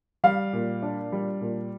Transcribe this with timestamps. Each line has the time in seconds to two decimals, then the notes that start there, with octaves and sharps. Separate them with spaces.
0.24 G3 F5
0.53 A#2
0.82 D4
1.12 G3
1.41 A#2